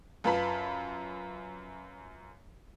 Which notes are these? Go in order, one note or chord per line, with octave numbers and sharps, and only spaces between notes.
F#2 F4 B4 A5 B5 B6